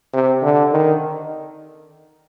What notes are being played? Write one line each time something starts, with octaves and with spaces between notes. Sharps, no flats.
C3
D3
D#3